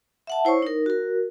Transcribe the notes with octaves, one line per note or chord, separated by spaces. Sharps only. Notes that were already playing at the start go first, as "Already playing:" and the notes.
E5 F#5 A5
E4 C5 C#5 C#6
D#4 A#4
F#4 A#4